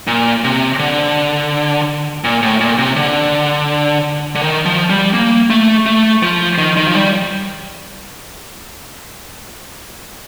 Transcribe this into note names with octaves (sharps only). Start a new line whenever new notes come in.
A#2
C3
D3
A#2
A2
A#2
C3
D3
D3
D#3
F3
G3
A#3
A3
A3
F3
D#3
D#3
F3
G3